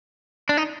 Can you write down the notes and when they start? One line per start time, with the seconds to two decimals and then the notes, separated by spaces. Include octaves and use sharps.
0.49 D4
0.57 D#4